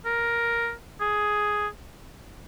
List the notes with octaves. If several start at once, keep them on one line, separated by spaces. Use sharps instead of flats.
A#4
G#4